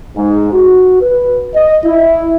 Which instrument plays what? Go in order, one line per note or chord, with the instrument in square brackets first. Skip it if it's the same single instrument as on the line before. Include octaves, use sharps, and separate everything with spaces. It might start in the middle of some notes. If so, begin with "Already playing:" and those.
[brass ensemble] G#2
F#4
B4
D#5
E4